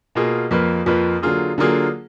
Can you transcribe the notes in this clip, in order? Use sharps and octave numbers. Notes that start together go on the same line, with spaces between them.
B2 A#3 F4 G#4
F2 F3 A#3 F4 B4
F2 F3 A#3 F4 B4
D3 F#3 A#3 F4 G#4
D3 F#3 A#3 F4 G#4